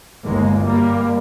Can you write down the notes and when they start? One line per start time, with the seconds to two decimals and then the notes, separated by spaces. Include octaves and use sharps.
0.24 G1 D#2 G#3 A#3
0.63 F#2 G3 A#3